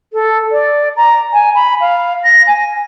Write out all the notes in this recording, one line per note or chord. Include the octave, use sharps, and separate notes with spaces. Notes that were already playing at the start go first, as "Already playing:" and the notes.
A4
D5
A#5
G#5
B5
F5
A#6
G#5